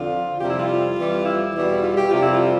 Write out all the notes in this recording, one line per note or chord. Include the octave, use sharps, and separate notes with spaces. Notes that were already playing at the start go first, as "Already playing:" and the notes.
Already playing: F2 D3 F3 F4
F2 C3 G3 G4
E4
F4
F2 E3 G3
E4
E2 B2 G3
F4
G4
F2 C3 G3 F4
E4
F4